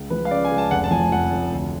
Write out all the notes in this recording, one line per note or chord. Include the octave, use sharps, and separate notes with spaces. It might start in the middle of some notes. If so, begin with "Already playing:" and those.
Already playing: C#2
F3 B4
F5
C#3 D5
G#5
C#2
A5
F1 F#5
A5
F3 G#5
F2 F#5
F1
D2